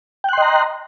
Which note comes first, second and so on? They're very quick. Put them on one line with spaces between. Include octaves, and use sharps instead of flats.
G5 F#6 C6 D#5 A#5